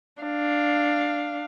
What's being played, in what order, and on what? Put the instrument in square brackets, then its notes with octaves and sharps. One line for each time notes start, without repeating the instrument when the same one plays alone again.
[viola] D4 F5